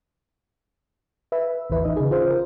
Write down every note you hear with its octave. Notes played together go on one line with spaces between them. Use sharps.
B4 E5
A1 E2 E3 B4 E5
D#4 D#5
C#3 G#4
F4 C5
A#4